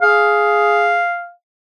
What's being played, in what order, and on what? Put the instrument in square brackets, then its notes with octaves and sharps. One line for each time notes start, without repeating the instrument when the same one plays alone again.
[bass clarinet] G#4 [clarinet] F5